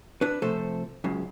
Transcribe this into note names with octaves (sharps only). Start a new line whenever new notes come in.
D4 B4
C3 F3 A3 A4 C5
C#2 F#2 C#3